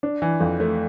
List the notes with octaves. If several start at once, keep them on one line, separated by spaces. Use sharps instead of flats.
D4
E3
F2
A3